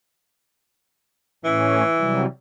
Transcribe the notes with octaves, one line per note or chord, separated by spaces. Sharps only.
A2 E3 C#4
C3 F#3 G3